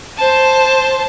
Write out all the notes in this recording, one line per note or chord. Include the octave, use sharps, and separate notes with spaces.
C5 A5